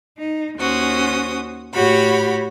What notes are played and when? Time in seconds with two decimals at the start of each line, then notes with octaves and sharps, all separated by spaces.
0.18 D#4
0.58 D#2 C#4 F#4 C5 D#6
1.74 A2 F#4 G4 C#5 B5